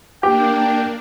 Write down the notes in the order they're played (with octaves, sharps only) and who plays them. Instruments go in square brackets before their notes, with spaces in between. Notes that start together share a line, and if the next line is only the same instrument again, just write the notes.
[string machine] A#3 D4 [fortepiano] G4 [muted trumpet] G5